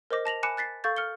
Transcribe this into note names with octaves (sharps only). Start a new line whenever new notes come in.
A#4 C5 D#5 D6 A#6
A5 A#6 F7 F#7
G#5 B5 D6 F#6 C#7 E7
F#6 A6 B6 C7
A4 F5 C#6 G6 A6
F6 C#7 G7